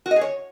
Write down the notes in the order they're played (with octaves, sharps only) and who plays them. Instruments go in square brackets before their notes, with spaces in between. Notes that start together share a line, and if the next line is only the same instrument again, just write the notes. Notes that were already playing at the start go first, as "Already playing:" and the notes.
[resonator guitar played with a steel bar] F#4
D#5
G#4
C#5